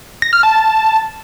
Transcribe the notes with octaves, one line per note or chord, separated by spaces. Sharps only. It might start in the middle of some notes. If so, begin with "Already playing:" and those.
A#6
F6
A5